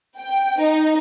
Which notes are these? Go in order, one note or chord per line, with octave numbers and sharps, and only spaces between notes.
G5
D#4